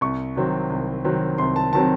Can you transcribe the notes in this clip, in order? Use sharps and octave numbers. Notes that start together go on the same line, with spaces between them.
C2 C#6
C3 D#3 F#3 C4
C2
C3 D#3 F#3 C4
C2 C6
A5
C3 D#3 F#3 C4 A5